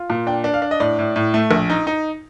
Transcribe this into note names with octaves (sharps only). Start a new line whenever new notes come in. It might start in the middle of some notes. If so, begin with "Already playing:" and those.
Already playing: F4
A#2
D4 G5
D4
F5
D4
D#5
A2 D5
A2
A2
A3
A#1
D#4
D#4